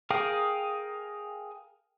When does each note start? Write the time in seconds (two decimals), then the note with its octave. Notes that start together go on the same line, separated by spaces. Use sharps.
0.10 G#4 A#4 F5 G5 D#6